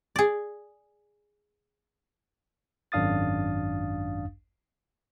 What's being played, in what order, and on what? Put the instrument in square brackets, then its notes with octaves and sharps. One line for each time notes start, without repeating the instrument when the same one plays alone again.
[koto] G#4 D5
[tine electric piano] G#1 F#2 D4 F5 D#6 A6